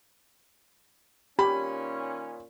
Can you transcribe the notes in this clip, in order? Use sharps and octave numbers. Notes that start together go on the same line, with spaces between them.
A#2 D#3 C#4 G4 B5